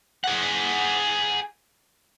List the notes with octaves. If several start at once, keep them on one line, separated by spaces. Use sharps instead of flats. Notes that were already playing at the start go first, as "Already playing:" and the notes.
G#4 F#5